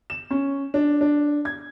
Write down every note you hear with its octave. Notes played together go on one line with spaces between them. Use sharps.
E7
C#4
D4
D4
G#6